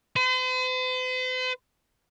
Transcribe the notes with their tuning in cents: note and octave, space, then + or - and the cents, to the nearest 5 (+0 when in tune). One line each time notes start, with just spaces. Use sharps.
C5 -45